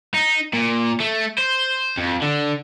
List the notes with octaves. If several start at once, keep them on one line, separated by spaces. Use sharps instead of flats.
D#4
A#2
A3
C5
F2
D3